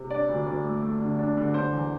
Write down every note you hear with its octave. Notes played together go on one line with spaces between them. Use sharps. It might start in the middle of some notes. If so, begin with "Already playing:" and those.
Already playing: C3
D4 D5
D2
D2
A3
A3
D3
D4
D3
D3 C5
E2